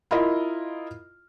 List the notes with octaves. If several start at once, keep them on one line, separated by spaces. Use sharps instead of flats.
E4 F4 A#4 D#5